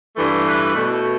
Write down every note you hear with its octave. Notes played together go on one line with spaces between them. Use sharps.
G2 E3 A3
B4
B2 A3